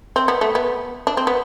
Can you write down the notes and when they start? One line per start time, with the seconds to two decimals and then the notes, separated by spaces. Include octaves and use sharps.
0.16 C4
0.28 B3
0.41 A3
0.55 B3
1.07 D4
1.17 C4
1.27 B3